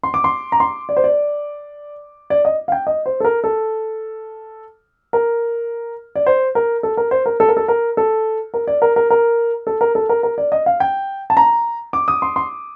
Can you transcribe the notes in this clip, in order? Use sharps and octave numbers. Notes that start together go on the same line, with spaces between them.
C6
D6
C6
A#5
C6
D5
C5
D5
D5
D#5
F5
G5
D#5
C5
A4
A#4
A4
A#4
D5
C5
A#4
A4
A#4
C5
A#4
A4
A#4
A4
A#4
A4
A#4
D5
A#4
A#4
A#4
A4
A#4
A4
A#4
A#4
D5
D#5
F5
G5
A5
A#5
D6
D#6
C6
C6